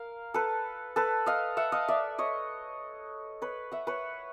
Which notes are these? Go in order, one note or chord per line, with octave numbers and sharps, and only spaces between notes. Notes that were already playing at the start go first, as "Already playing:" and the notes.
Already playing: A#4 F5
A4 B4
A4 B4
D#5 F5
E5 F#5
D#5 F5
D5 E5
C#5 D#5
B4 C#5
E5 F#5
B4 C#5